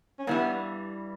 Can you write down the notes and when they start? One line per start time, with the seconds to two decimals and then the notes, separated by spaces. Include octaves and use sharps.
0.19 C#4
0.27 G2 E3 G3 B3